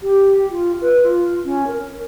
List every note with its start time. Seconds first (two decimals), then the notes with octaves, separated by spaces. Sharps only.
0.01 G4
0.50 F4
0.81 B4
1.02 F4
1.45 C#4
1.67 A#4